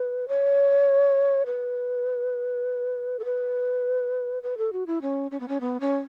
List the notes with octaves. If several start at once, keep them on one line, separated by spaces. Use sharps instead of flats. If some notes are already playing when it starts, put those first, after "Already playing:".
Already playing: B4
C#5
B4
A4
B4
B4
A4
F#4
E4
C#4
C#4
B3
C#4
B3
C#4